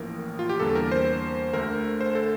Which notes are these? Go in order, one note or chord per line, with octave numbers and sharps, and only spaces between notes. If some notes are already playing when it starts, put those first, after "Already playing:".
Already playing: A1 A2 F3 A#3 A#4
F4
G4
E2 D3 G3 A#3 A4
A#4
C5
D2 D3 A3 A#4
C5
A4